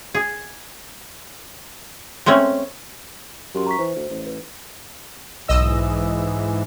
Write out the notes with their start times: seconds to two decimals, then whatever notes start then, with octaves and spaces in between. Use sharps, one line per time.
0.15 G#4
2.26 G#3 A3 C4 C#4
3.55 F#2 G4 C6
3.67 A#5 C#6 B6
3.79 E3 C5
3.96 D2
4.10 A1
4.27 B4
5.48 B1 G#2 E3 D#5 E6